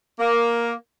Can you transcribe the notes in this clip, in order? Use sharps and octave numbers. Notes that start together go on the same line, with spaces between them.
A#3